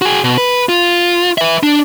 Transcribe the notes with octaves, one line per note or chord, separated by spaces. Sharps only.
F#4 G#4
B2
B4
F4
B4 E5
D4